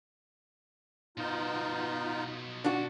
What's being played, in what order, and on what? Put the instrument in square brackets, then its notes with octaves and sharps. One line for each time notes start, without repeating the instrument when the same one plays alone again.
[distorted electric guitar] B2 C5 [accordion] B3 D#4 F4
[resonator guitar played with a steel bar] D4 F#4